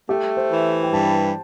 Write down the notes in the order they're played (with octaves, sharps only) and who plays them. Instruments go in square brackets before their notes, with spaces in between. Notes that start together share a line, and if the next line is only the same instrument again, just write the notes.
[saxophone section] A3 [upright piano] G4
[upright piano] C5
[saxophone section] E3
[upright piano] G5
[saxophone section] G2 [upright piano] A5